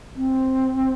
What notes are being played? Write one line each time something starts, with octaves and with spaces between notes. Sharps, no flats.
C4